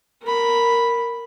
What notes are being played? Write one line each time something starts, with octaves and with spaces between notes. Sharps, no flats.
A#4 B5